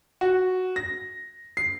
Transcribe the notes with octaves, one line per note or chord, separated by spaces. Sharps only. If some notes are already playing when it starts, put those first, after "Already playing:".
F#4
A#6
C7